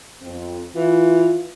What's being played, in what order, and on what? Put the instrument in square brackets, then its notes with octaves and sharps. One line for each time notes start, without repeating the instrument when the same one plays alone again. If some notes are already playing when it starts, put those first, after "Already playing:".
[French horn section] F2 C4
[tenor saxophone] E3 [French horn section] E4 F4